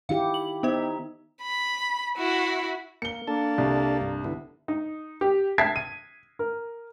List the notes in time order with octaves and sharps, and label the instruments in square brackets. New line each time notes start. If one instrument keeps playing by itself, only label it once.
[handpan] D#3 E4 G4 [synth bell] F5
[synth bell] F#7
[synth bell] B3 C5 [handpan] D#4 E5
[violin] B5
E4 F#4
[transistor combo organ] A#3 [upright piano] C#7 G7
[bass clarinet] A#3 [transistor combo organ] D4 A4 A5
[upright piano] C2
[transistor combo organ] G2
D3 B3 E4
[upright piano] D#4
G4
E5 A5 G#6 B6 C7
D#7
A#4